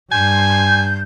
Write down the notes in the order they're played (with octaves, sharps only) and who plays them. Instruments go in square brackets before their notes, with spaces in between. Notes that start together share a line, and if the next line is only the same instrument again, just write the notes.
[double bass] G2 [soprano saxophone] G#5 [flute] G6